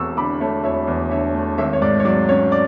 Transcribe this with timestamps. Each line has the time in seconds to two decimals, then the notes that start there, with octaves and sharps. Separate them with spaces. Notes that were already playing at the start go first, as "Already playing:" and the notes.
Already playing: E1 E2 C#6 E6
0.17 D3 B5 D6
0.40 A3 C#5 E5
0.64 E1 C#5 E5
0.87 E2
1.11 D3 C#5 E5
1.34 A3
1.58 G#1 C#5 E5
1.73 C#5
1.81 G#2 D5
2.00 C#5
2.05 F#3 D5
2.29 C#4 C#5
2.52 D5